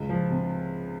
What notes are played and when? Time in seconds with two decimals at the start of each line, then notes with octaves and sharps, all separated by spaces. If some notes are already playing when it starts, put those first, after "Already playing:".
Already playing: C#2
0.09 F3
0.30 C3